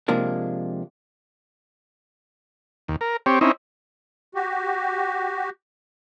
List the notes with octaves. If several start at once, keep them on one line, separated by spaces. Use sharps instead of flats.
C3 F3 G#3 A#3 D4
D#2
A#4
C4 G4 C#5
C4 C#4 D#4 E4
F#4 G4